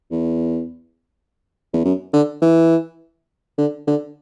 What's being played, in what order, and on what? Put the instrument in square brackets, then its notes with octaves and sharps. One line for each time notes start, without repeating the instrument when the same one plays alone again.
[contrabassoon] E2
E2
F#2
D3
E3
D3
D3